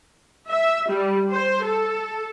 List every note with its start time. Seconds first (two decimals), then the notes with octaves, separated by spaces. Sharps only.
0.49 E5
0.91 G3
1.31 C5
1.64 A4